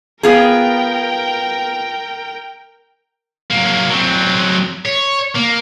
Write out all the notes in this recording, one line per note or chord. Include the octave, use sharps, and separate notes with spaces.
B3 F4 G#4 A#4 G5
F#3 A#3
F#3 C4
C#5
A#3